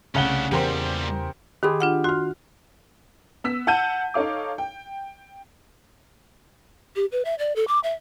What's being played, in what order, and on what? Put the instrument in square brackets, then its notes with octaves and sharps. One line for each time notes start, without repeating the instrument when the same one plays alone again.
[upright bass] C2 A3 [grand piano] C#3 F#5 G7 [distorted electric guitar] C#4 D4
[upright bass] E2 [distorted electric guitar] A#2 G3 [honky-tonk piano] G4 A#4 C5
[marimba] D#3 B5 C6 [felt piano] G4 G#4
[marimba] D4 F4 F#5
[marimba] F#4 [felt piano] C6 F6
[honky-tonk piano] B3 E6 B6
F#5 A5 E6 G6 D#7
D#4 A4 C#5 F5 D6
G5
[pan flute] G4
B4
E5
D5
A4
D6
E5